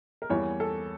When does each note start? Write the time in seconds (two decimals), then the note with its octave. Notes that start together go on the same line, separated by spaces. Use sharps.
0.22 A#4
0.30 E2 E3 G3 A#3 C#5
0.60 A4